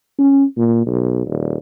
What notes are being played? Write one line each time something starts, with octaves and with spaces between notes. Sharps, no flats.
C#4
A#2
B1
D#1